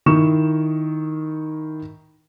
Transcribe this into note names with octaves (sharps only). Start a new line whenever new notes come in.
D#3 E4 C#6 E7